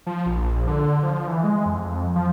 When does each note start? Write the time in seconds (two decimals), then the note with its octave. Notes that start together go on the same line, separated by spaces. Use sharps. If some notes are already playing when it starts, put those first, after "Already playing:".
0.06 F3
0.26 A#1
0.67 D3
1.03 F3
1.27 E3
1.44 G#3
1.66 F2
2.16 F3